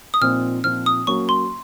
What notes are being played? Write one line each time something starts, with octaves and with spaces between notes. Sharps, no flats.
D#6
A#2 F3 C4 D#4 F6
A#2 F3 C4 D#4 F6
D#6
F#3 A#3 C#4 C#6
C6